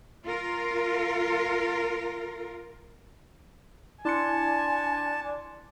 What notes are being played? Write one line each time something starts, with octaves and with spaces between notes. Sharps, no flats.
F4 A#4
D4 E4 G#5 A5 C6 C#7